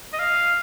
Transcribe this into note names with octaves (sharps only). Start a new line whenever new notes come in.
D#5
F5